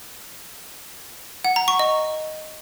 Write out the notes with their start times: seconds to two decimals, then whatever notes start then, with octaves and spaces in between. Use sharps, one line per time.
1.45 F#5
1.56 A#5
1.68 C#6
1.79 D#5